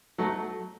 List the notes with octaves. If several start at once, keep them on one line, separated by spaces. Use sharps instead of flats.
F#3 A3